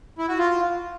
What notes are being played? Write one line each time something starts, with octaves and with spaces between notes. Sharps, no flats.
E4
F#4
F4